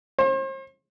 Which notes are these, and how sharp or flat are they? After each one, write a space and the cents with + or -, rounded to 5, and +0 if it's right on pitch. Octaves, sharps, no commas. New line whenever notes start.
C5 +40